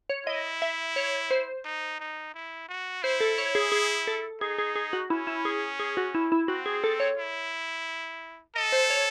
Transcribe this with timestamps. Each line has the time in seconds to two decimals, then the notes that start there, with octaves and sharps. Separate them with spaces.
0.10 C#5
0.27 E4 D#5
0.62 E5
0.96 C#5
1.31 C5
1.65 D#4
2.00 D#4
2.34 E4
2.68 F#4
3.03 E4 C5
3.21 A4
3.38 C#5
3.55 G#4
3.72 G#4
4.07 A4
4.41 D#4 G#4
4.58 G#4
4.76 G#4
4.93 F#4
5.10 C#4 E4
5.27 E4
5.45 G#4
5.80 G#4
5.97 F#4
6.15 E4
6.32 E4
6.48 C4 F#4
6.66 G#4
6.84 A4
7.00 C#5
7.18 E4
8.56 A4 D#5
8.72 C5
8.90 C#5